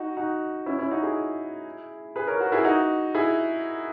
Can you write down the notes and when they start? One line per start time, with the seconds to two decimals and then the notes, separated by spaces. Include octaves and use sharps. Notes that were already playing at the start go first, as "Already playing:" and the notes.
Already playing: D#4 F#4
0.17 D#4 F#4
0.66 C#4 E4
0.79 C#4 E4
0.91 D#4 F#4
1.03 E4 G#4
2.16 G#4 B4
2.27 A#4 C#5
2.40 F#4 A#4
2.52 E4 G#4
2.65 D#4 F#4
3.15 E4 G#4